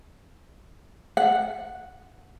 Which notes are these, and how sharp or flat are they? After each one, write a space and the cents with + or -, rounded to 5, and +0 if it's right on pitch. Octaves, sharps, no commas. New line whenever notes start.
F#5 -5